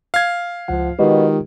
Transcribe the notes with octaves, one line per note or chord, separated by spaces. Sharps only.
F5 G#6
C#2 F3 F#5
B2 D#3 G#3 F4 G4